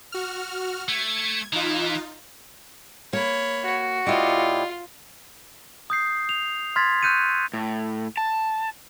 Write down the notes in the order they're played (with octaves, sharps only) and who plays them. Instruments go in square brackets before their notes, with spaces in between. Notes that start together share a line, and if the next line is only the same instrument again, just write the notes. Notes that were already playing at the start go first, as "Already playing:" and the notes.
[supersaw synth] F#4 F6
[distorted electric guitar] A3 [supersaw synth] G#6
[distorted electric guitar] E3 [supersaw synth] D#4 F4
[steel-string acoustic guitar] A#3 [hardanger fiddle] C#5 B5
[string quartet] F#4
[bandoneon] A2 E4 G4 [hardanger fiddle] F4 [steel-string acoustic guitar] D5 D#5
[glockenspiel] D#6 G6 C7
F7
C6 F6 G#6 A6 B6
C#6 E6 F#6 G6 C#7 D#7
[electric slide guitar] A2
A5